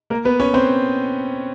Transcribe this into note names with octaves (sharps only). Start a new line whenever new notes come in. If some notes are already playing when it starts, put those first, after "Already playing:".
A#3 A#4
B3 B4
C#4 C#5
C4 C5